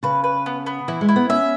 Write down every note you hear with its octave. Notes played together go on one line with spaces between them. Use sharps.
C#3 B4
B4
B3
B3
E3 E4
G#3
E4
B3
C#4 E5